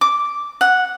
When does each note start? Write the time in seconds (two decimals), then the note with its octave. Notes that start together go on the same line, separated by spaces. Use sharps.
0.01 D6
0.61 F#5